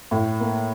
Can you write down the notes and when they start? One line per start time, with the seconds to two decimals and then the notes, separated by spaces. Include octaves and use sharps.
0.11 A2
0.40 A#3